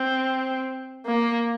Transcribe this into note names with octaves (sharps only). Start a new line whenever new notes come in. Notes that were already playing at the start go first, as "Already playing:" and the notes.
Already playing: C4
A#3